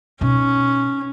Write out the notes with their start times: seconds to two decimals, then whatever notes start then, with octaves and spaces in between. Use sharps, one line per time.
0.21 B2 C#4 D#4